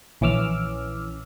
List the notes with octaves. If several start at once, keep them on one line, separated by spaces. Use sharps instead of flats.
A#1 E3 C#4 D6 E6 F6